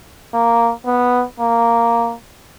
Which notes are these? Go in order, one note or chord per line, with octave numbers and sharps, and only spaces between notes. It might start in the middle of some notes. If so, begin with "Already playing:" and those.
A#3
B3
A#3